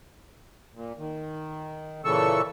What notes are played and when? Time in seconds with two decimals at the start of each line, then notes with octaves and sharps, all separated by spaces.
0.75 A#2
0.98 D#3
2.05 A#2 C#3 E3 A4 C#6 E6